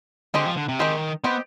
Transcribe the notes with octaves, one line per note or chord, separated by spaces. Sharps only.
D3 G#3 C4 G4 C5 D#5
F3
D3
C3
D#3 G#3 C4 G4 C5 D#5
B3 C4 G4 C5 D#5